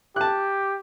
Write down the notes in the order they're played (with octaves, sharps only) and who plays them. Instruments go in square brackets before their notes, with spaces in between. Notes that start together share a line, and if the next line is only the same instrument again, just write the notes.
[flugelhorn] G4 [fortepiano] A5 F#6